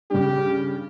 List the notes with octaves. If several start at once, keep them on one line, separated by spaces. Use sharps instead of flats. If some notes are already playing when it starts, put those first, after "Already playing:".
G2 C#3 G4